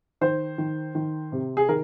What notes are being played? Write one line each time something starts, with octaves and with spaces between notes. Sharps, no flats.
D#3 C5
D#3
D#3
C3
G#4
D#3 A#4